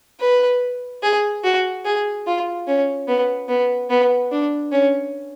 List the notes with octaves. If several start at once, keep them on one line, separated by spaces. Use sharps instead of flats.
B4
G#4
F#4
G#4
F4
C#4
B3
B3
B3
D4
C#4